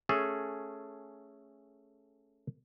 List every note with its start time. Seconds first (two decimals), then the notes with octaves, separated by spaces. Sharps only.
0.09 A3 C#4 G#4 A4